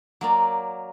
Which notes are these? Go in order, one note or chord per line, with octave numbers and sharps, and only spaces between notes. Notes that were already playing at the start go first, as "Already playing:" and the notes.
F#3 A#3 D5